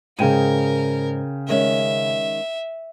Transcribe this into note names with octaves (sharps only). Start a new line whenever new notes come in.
G#2 C#3 A#4 G5 D#7
D#3 G#3 C#4 E5